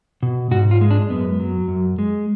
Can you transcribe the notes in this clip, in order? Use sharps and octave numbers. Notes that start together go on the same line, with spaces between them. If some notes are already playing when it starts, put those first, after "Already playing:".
B2
G#2 F#4
F4
G#3
D4
F#2 B3
F#3
F#2
G#3